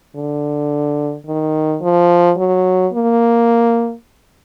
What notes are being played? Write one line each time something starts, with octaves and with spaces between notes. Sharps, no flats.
D3
D#3
F3
F#3
A#3